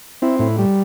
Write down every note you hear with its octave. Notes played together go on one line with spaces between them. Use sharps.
C4 E4
A2 E4
G3